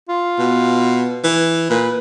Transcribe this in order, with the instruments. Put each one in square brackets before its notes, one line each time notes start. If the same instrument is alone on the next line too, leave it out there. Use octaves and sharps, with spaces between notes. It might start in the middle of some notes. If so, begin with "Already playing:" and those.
[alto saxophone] F4
[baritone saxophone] B2
E3
[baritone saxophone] A#2 [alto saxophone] B4